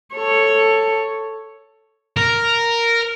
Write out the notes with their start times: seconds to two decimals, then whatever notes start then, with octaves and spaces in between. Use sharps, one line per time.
0.15 A4 C#5
2.17 A#4